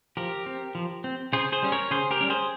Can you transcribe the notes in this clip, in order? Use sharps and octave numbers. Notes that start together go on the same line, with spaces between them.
F3 G4 A#4
C4
F3
C4
C#3 G#4 C5
G#4 C5
G3 C#4
A#4 C#5
C#3 G#4 C5
G4 A#4
G3 C#4
G#4 C5